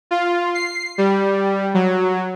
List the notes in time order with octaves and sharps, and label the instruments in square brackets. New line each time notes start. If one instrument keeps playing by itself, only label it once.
[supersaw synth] F4
C7
G3
F#3